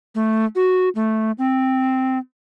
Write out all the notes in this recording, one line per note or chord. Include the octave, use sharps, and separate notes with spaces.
A3
F#4
A3
C4